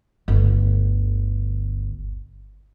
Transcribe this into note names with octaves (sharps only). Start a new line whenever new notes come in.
G1 D2